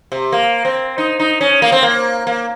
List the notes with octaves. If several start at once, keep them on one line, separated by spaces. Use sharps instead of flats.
C3
A#3
C4
D#4
D#4
C#4
A#3
C4
A#3
A#3